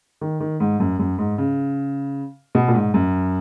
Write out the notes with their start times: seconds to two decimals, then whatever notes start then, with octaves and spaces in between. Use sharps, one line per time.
0.21 D#3
0.40 D#3
0.60 G#2
0.80 F#2
0.99 F#2
1.18 G#2
1.38 C#3
2.55 B2
2.68 A#2
2.74 G#2
2.94 F#2